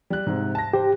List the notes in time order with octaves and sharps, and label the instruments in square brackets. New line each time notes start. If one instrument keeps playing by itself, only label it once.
[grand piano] G3 F#6
G#2 C3
A5 A#6
[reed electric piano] G4 [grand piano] C5